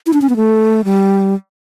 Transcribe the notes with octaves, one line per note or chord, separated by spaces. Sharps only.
E4
D4
C#4
B3
A3
G3